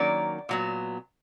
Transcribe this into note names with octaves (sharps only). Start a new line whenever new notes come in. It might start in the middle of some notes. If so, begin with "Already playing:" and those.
Already playing: D#3 F#3 A#3 C#4 D5
A#2 F#3 B3